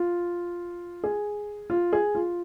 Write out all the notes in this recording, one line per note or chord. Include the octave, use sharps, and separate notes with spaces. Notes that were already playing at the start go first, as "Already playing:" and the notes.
Already playing: F4
G#4
F4
G#4
F4